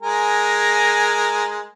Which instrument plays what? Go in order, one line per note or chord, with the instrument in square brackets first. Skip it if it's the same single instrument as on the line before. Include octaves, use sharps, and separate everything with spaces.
[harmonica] G#3 A#4 G#5